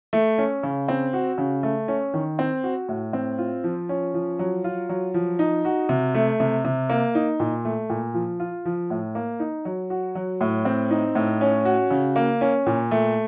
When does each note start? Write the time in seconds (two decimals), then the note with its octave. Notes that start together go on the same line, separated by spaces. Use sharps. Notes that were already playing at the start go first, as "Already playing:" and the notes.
0.13 A3
0.38 C#4
0.63 C#3
0.88 C4
1.13 F#4
1.38 C#3
1.63 A3
1.88 C#4
2.14 D#3
2.39 C4
2.63 F#4
2.89 A2
3.13 C4
3.38 F4
3.64 F3
3.89 C#4
4.14 F3
4.39 F#3
4.64 F4
4.89 F#3
5.14 F3
5.39 D#4
5.65 F#4
5.89 C3
6.15 A3
6.40 C3
6.65 C3
6.90 A#3
7.15 D#4
7.40 A#2
7.65 A3
7.90 A#2
8.14 F3
8.40 F4
8.65 F3
8.90 A2
9.15 A#3
9.40 D#4
9.65 F#3
9.90 F#4
10.15 F#3
10.41 A2
10.65 C4
10.91 D#4
11.15 A2
11.41 C#4
11.65 F#4
11.91 C#3
12.16 A#3
12.41 C#4
12.66 A#2
12.91 A3